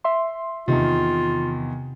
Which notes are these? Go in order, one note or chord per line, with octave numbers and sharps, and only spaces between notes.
E5 C6
E2 C3 D#3 F4